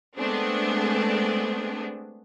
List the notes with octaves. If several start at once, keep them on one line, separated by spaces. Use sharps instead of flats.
G#3 A3 B3 C4 D4 G#4